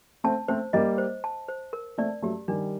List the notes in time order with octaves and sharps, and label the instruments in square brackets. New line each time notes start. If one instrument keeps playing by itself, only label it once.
[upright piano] A3 C4 [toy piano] A5
[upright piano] A3 C4 [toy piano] C5
[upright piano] G3 A#3 [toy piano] D#5
[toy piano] C5
A5
C5
A#4
[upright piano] A3 C4 [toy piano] D5
[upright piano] F#3 A3 [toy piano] G4
[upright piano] D#3 G3 [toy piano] D4